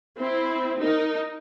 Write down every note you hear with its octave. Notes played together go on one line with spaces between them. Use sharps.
C4 E4
D#4 A#4